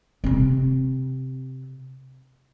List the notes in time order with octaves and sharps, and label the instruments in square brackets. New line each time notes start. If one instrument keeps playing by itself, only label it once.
[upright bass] C3 C4